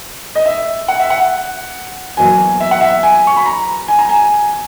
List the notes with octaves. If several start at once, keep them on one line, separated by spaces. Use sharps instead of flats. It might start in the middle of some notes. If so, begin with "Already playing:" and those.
D#5
E5
F#5
E5
F#5
E2 B2 F#3 A#3 G#5
E5
F#5
E5
G#5
C#6
B5
A#5
G#5
A#5
G#5